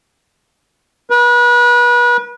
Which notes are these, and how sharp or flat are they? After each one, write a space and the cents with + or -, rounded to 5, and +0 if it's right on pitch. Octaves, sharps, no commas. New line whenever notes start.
B4 -35